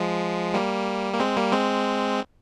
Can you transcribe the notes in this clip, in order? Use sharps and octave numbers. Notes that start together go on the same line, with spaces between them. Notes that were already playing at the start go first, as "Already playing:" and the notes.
Already playing: F3 G#3
G3 A#3
A#3
G#3 C4
G3 A#3
G#3 C4